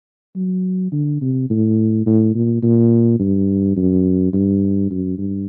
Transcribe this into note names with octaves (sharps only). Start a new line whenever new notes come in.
F#3
D3
C3
A2
A2
A#2
A#2
G2
F#2
G2
F#2
G2